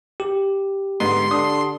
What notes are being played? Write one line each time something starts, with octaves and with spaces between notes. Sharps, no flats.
G4
G#2 D3 B3 C6
D3 D#6